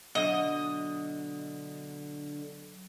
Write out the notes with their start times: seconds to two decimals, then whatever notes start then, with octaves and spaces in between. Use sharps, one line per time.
0.15 B2 D3 F#3 D#5